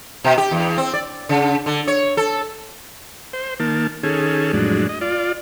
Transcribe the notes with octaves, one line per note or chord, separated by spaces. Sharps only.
B2
G4
E2
C4
D5
C#3
D3
C#5
A4
C5
D#3 A#3 A5
D#3 C#4 G#4 A4
F2 A2 F#3 G#3 D4
D#5
F4 D5